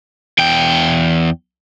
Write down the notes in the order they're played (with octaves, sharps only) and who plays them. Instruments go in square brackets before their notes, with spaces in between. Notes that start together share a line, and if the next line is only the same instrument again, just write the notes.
[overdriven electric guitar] E2 G5